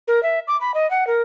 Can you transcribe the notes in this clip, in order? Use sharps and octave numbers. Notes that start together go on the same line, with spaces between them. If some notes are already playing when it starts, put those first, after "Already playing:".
A#4
E5
D6
B5
D#5
F#5
A#4